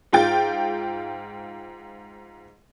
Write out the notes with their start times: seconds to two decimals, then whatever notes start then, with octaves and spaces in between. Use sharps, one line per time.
0.13 G#2 F4 G5 A6